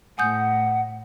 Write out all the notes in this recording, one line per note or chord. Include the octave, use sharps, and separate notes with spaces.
A2 F#5 G#5 D#6 G6